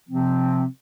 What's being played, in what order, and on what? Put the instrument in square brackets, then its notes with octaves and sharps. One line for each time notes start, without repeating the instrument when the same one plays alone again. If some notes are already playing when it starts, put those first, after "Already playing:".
[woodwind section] C3 F3 C4